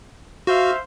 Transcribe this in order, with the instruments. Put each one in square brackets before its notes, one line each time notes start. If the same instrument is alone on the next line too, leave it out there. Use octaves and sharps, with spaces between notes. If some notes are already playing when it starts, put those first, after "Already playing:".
[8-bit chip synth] F#4 [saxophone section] C5 E5 F5